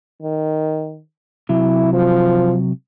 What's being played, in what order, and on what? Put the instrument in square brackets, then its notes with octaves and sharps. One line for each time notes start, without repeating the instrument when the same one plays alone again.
[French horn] D#3
[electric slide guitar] C3 F#3 [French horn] E4
[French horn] F3